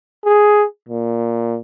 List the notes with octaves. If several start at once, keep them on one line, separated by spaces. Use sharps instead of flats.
G#4
A#2